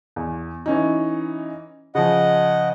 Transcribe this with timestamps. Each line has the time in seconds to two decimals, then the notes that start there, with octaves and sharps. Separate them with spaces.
0.16 E2
0.66 E3 C#4 D#4
1.95 C#3 F3 D#5 F#5